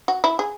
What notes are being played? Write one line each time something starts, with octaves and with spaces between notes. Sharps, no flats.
F#4
E4
G#4